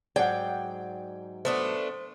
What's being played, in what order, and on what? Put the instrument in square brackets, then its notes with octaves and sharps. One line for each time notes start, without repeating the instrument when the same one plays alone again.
[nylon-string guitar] G#2 F#3 D5 [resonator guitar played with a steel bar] G#4 F#5 [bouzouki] G5
[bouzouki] A3 B3 D4 [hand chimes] C5